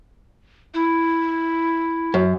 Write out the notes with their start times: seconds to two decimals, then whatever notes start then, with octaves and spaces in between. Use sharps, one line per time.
0.74 E4
2.14 F#2